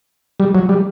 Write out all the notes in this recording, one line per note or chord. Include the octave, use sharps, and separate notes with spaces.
G3
F#3
G3